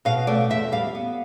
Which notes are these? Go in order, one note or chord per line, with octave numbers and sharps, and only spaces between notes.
B2 F5
A3 D5
E2 E5
G3 F5
B3